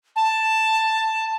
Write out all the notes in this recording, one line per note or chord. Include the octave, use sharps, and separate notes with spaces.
A5